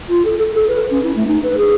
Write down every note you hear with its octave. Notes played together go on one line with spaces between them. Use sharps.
F4
A4
A4
A4
B4
C#4
E4
A3
D#4
B4
G#4